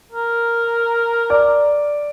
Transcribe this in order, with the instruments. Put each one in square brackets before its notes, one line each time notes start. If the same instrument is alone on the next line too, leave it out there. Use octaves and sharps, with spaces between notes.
[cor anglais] A#4
[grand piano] D5